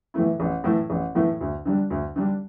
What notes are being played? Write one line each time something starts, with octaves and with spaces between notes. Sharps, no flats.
A2 E3 A3 E4
A1
A2 E3 A3 E4
A1
A2 E3 A3 E4
D2
D3 G3 D4
D2
D3 G3 D4